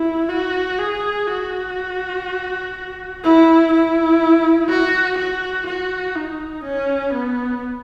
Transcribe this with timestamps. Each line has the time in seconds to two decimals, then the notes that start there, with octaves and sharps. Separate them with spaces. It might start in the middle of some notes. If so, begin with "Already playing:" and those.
Already playing: E4
0.29 F#4
0.78 G#4
1.27 F#4
3.23 E4
3.72 E4
4.69 F#4
5.18 F#4
5.67 F#4
6.16 D#4
6.64 C#4
7.13 B3